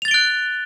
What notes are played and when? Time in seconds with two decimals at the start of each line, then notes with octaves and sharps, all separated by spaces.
0.02 F7
0.05 A6
0.08 G7
0.11 D7
0.14 F#6